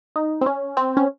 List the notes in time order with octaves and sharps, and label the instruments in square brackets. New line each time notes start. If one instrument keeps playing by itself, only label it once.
[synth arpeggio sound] D#4
C4
C#4
C4
C#4